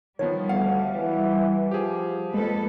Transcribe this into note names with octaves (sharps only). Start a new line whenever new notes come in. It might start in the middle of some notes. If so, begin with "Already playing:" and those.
D#3 F3 G3 B3 C#5
D2 F5 F#5
E3
F3 G4 G#4
F2 G#3 A#3 A4 B4